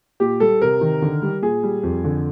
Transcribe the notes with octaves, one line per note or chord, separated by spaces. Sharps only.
A#2 G4
G3 A4
C3 A#4
D#3
D3
G3
A#2 G#4
G3
F2
D3